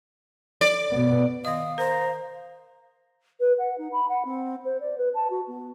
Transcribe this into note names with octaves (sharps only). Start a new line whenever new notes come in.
D5
B2 B3
D#3 D#5 F5 D#6
A#4 C5 A#5
B4
F#5
D#4
B5
F#5
C4
C5
D5
B4
A5
F#4
B3